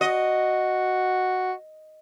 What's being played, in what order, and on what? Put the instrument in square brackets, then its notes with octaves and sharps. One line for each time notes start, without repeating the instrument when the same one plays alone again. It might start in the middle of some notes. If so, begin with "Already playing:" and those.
[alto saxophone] F#4 [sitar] D#5